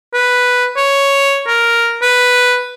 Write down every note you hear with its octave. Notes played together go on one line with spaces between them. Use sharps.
B4
C#5
A#4
B4